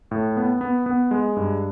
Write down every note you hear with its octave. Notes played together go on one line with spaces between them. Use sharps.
A2
B3
B3
B3
G#3
G2